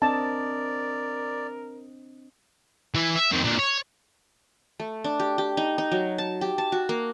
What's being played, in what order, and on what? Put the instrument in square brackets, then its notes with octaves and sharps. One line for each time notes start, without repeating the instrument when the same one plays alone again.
[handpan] C4 D4 D#5 [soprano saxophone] A#4 [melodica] D5 [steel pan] A5
[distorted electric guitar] E3 E4
E5
F2 D#3
A#2 D3
C#5
[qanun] A3
D4
G4
G4
D#4
D#4
F#3
A5
G4
A5
F#4
A#3